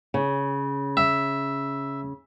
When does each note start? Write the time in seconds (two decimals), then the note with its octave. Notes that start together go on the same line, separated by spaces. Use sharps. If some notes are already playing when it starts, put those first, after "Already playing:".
0.14 C#3
0.97 E5